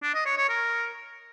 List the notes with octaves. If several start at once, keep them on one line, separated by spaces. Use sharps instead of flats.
D4
D#5
C#5
C#5
A#4